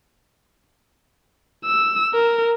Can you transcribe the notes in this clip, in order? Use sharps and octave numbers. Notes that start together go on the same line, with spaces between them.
E6
A#4